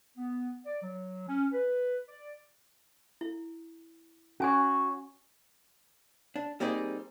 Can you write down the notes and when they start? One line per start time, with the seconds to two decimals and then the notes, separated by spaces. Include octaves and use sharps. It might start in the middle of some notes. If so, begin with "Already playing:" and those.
0.17 B3
0.66 D5
0.83 F#3
1.28 C#4
1.53 B4
2.07 D5
3.21 E4
4.40 C#4 F#4 C#5 G#5
6.36 D4
6.60 G3 A#3 C4 D#4 G4 G#4